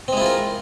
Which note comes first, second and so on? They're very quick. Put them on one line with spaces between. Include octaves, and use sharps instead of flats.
C4 G#3 E4 F4 A#4